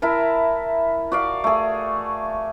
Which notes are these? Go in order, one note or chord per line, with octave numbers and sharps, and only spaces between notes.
E4 A#4 E5 A5
F#4 D5 F5
A3 G#4